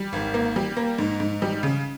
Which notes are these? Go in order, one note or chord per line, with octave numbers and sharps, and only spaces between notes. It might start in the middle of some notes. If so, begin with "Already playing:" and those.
Already playing: G3
G#1
A#3
G3
A#3
G#2
G#2
G3
C#3